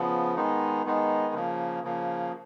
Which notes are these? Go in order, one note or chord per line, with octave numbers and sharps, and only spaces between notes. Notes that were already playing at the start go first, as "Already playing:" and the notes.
Already playing: C#3 F3 B3
D#3 G#3 B3 D#4
D#3 G#3 B3 D#4
C#3 F3 A#3
C#3 F3 A#3